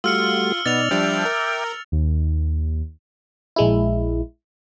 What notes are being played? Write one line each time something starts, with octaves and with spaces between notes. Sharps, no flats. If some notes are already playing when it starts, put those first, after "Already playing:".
G3 A3 F4 F#4 E6 F6 C#7
B2 B3 D#4 D5 A6 F7
F3 G3 D4 E5 G5 D6
A#4
D#2
A#1 G#3 E4